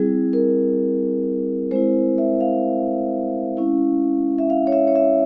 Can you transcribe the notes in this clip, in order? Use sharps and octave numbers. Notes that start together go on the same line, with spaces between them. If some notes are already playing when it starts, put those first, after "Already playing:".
Already playing: G3 C4 E4 G#4
A#4
G#3 C4 E4 C5
E5
F5
G#3 C#4 E4
E5
F5
C#5
E5
C#5
E5